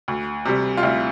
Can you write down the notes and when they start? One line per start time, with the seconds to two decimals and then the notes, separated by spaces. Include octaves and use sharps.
0.08 D2
0.45 C3 G3
0.77 F4
0.83 D2 E4